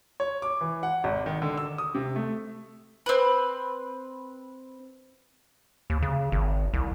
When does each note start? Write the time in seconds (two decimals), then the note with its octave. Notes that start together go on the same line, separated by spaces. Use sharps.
0.20 C#5
0.42 D6
0.61 E3
0.83 F#5
1.04 G#1
1.26 D#3
1.42 D3
1.57 E6
1.78 D#6
1.95 C3
2.16 A3
3.06 C4 B4
5.90 D#2
6.02 C#3
6.32 G#1
6.74 C2